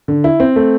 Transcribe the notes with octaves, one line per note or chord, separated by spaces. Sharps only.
D3
E4
C4
A3